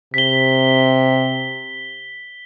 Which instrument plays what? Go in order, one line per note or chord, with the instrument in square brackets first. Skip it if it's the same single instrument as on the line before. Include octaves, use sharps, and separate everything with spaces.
[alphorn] C3 [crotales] B6 G7